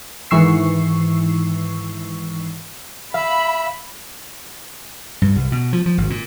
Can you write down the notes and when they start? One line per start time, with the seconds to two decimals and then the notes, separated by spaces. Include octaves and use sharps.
0.31 G#2 D#3 E3 C#6 E6 C7
3.14 E5 F5 B5
5.22 G2
5.35 C2
5.52 B2
5.73 F3
5.86 F3
5.98 G#1
6.10 A#2